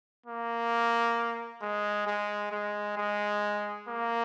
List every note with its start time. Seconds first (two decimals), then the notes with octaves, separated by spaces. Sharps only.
0.26 A#3
1.61 G#3
2.07 G#3
2.51 G#3
2.97 G#3
3.88 A#3